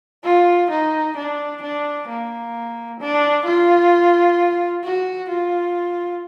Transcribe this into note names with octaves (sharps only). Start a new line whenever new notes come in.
F4
D#4
D4
D4
A#3
D4
F4
F#4
F4